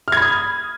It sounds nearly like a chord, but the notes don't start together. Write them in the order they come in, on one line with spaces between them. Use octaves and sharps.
F6 G#6 B5 D#6